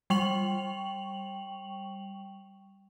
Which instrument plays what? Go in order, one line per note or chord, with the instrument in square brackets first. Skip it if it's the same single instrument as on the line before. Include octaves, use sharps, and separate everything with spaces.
[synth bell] G3 G5 C#6 F7 F#7